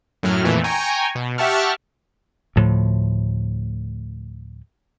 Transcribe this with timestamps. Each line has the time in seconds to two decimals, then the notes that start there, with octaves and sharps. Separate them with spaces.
0.23 F#2 A2 F#3 F6
0.44 F2 A#2 E3 A3
0.64 G5 G#5 A#5 C#6
1.15 B2
1.38 G4 E5 F#5 A5 C#6 F6
2.56 D2 A2 F3